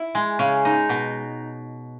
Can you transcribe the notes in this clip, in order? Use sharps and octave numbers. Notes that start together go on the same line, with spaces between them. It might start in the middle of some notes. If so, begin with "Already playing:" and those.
Already playing: E4
G#3
C#3
D#4
B2